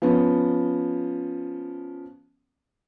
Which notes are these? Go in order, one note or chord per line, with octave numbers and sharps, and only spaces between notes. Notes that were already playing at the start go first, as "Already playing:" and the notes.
F3 B3 C#4